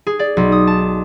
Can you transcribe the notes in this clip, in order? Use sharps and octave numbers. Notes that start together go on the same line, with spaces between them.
G#4
D5
B1
D#6
A5